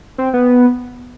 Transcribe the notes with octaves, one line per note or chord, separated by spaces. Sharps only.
C4
B3